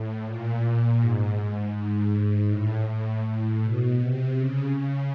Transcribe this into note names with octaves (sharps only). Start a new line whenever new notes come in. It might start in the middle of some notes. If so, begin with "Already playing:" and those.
Already playing: A2
A#2
G#2
G#2
A2
A2
A2
B2
C3
C#3
C#3